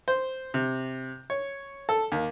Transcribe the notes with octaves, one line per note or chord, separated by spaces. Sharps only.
C5
C3
C#5
A4
D#2